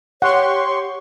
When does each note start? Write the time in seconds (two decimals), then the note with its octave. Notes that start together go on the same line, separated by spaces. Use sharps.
0.22 G4 C#5 F#5 C6 C#6